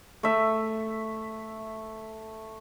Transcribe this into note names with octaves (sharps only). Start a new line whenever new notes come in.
A3 E5